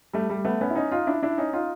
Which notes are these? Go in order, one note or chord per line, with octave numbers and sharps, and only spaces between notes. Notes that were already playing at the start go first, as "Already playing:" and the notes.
G3 A3
G3 A3
A3 B3
B3 C#4
E4
C#4 D#4
D#4 F4
D4 E4
D4 E4
C#4 D#4
D#4 F4